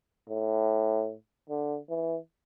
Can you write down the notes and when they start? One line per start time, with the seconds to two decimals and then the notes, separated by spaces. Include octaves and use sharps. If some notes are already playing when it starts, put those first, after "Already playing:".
0.29 A2
1.50 D3
1.90 E3